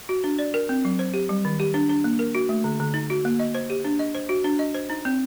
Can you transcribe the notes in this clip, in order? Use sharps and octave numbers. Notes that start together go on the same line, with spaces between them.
F#4
D4
D5
A#4
C4
F#3
C5
G4
G3
D#3
G4
D4
D4
A#3
A#4
F#4
A3
D3
D3
D#4
F#4
A#3
D#5
C5
G4
D4
D#5
C5
F#4
D4
D#5
C5
D#4
C4